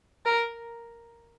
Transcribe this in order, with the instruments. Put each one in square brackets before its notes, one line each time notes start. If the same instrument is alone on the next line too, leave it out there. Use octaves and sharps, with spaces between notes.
[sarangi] A#4